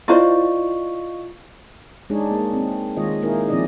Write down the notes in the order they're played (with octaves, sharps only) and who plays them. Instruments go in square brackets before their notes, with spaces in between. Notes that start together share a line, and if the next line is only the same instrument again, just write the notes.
[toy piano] E4 [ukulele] F4 C5 D5 [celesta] D#5 F5 C#6
[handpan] G#3 D4 D#4 G#4 C#5
A#3
C4 G#4
D#3 G#3 F4 C#5 D#5
A#3 D#4 E4 G#4 A#4
F3 C4 E4 G#4 D5 D#5